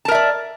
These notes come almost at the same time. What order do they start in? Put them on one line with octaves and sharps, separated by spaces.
A5 A#4 E5 D5